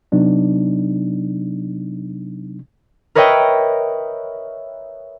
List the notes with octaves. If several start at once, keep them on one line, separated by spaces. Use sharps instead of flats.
C3 F#3 B3 D4 D#4
A#4 B4 C#5 D#5 E5 G5